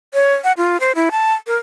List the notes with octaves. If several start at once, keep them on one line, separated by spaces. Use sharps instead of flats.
C#5
F#5
F4
C5
E4
A5
A#4